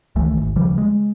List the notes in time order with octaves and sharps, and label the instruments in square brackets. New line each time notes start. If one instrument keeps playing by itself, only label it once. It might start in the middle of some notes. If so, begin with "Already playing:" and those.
[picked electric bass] C#2 D#3 E3 A3
G#1
D#2 C#3 F3 G3
G#3